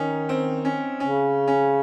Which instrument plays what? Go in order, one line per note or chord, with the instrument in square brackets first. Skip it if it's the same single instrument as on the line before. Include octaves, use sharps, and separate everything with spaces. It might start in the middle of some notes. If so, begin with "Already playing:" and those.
Already playing: [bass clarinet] D#3 [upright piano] C#4 D#4
[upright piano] C4
C#4
[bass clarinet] C#3 [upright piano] C#4
[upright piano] C#4